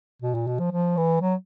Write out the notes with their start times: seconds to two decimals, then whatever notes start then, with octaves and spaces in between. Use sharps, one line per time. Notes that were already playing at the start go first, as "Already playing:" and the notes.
0.22 B2
0.34 A#2
0.47 B2
0.59 F3
0.72 F3
0.97 E3
1.21 F#3